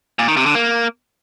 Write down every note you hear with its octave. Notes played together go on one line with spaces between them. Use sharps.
A#2
D#3
C3
D3
A#3